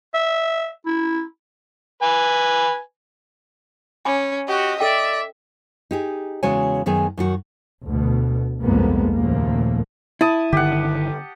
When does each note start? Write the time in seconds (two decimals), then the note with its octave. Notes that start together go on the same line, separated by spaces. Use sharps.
0.14 E5
0.86 E4
2.03 B4 G#5
4.05 C#4 G#5 B5 D6
4.48 F#4 G4 D#5
4.80 A4 D5 E5 G5
5.91 D#4 G4 G#4
6.43 E2 C#3 G#3 F#4 C#5 G#5
6.86 F#2 D#3 B3 G#4 G#5
7.17 F#2 D#3 F#4
7.85 D2 B2
8.62 G1 C2 F2 G#3 A#3 B3
9.14 D#2 A#2 C#3 F3 A3 A#3
10.21 E4 A5 D#6
10.53 G1 D3 D#3 G4 F#5